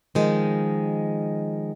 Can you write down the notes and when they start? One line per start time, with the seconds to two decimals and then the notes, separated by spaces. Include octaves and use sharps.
0.15 D#3 F3 G#3